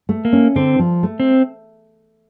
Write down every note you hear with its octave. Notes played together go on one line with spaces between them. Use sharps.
A3
A#3
C#4
D3 C4
F3
A3
C4